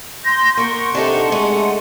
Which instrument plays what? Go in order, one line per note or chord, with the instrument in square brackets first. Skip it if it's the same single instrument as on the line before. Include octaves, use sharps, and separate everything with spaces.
[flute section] C6 G6 [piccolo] A#6
[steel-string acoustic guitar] A#3 A#4 [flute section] F#5 C6 [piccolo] C#6
[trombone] C3 [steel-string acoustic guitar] D4 D#4 A4
[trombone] G#3 [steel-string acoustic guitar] A3 D#5